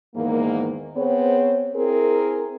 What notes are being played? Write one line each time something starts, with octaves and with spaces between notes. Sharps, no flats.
E2 G#2 D#3 A#3
B3 C4 G#4 C5 C#5
C4 E4 G#4 A#4